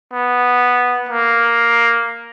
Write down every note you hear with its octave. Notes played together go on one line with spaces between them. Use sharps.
B3
A#3